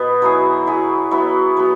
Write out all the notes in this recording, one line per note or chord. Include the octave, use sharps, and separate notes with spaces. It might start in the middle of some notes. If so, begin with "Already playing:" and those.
Already playing: B2 B3
F#3 E4 G#4
F#3 E4 G#4
F#3 B3 E4
F#3 B3